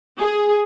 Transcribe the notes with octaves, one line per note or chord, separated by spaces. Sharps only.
G#4